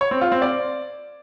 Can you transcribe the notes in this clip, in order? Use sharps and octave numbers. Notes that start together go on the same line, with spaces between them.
C#5
C4
F4
C4
D5